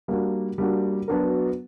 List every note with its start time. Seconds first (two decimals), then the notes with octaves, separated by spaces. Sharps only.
0.08 G3 A#3 D4 F#4
0.58 G3 A#3 D4 F#4
1.08 F#3 B3 D4 F#4 A#4